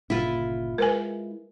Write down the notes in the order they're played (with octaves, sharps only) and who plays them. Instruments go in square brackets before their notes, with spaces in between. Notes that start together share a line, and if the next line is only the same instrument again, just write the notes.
[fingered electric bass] G1 A#2 C#3 [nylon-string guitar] E4 F4
[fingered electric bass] G#3 [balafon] A#4 B4 G#5